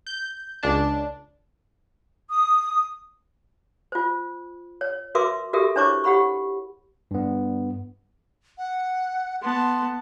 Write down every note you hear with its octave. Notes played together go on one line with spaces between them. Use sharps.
G6
C#2 D4 A5
D#6
F4 C5
C#5
F#4 A#4 B4 E5 C6 D6
F#4 G4 A4 A#4 E5
D4 E4 C5 C#5 C#6 D6
G4 F#5 B5 C#6
G2 B3
F#5
B3 A5 C6